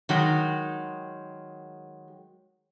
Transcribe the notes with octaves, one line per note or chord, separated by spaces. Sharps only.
D#3 F#3 G#3